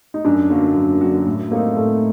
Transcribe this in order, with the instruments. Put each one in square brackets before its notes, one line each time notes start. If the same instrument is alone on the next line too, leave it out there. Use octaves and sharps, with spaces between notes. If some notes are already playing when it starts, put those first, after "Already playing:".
[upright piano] D#4
[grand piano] F#2 [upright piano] D4
[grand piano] D3 F#3 A#3 F#4
F#2
D3 F#3 A#3 F#4
A2
[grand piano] A3 C4 D#4 [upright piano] A#3
[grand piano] A2 [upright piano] A3